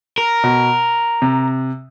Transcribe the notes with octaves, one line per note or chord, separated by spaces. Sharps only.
A#4
B2
C3